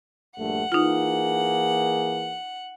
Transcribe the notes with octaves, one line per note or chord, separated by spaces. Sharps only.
A#1 G2 A3 F#5
E3 A#3 D#4 F4 G#4